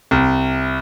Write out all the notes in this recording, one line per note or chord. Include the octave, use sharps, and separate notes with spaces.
C2